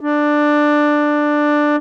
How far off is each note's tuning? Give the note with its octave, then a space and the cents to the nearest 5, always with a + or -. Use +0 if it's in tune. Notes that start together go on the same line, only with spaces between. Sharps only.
D4 +10